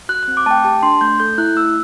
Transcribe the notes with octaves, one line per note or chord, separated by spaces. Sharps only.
F#4 F#6
F#6
C4
D6
A3 G5 A5
G4 A5
D4 C6
A3 G6
A4 G6
E4 F#6
A3 E6